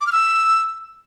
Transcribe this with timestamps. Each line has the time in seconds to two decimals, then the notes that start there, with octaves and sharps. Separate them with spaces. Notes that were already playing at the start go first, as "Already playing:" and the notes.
0.01 D6
0.07 F6
0.12 E6